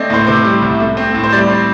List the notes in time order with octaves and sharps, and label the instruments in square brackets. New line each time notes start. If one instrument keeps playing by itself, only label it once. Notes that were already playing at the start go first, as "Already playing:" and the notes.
Already playing: [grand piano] A3 C4 D5 D#5
A2 C5
C3 C5
G3
C2
A3
C4
A2
C5
G3 D5
C4